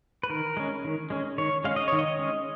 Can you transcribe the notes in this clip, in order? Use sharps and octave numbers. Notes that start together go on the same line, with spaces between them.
B4
D#3 A#4
G#3 C#4
D#3
G#3 C#4
D#3 C#5
G#3 C#4 F5
D#5
D#3 C#5
D#5
G#3 C#4